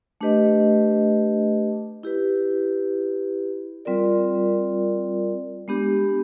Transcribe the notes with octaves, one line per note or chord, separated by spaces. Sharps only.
A3 D4 G4 B4 D#5
E4 G4 B4
G3 C4 F4 A#4 D5
G#3 B3 D4 G4